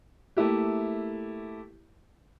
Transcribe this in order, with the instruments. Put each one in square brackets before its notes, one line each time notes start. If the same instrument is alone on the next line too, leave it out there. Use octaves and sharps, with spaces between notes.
[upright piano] A3 A#3 E4 G4